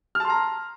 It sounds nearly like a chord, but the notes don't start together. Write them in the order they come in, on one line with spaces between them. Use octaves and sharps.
F6 A5 C6 A#5